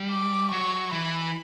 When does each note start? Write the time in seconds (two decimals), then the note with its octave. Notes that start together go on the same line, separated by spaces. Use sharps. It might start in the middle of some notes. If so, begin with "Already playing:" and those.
Already playing: G3
0.10 D6
0.51 F#3 C#6
0.93 E3 B5